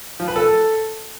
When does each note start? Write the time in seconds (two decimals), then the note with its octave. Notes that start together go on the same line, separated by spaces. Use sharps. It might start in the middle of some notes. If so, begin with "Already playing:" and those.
0.20 F3
0.28 B4
0.36 A4